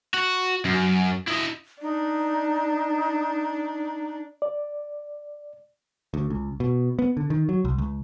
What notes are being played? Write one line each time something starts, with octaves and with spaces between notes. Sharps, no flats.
F#4
F#2
E4 D#5
D4 D#4
D5
D2
C#2
B2
B3
D3
D#3
F#3
C2
C#2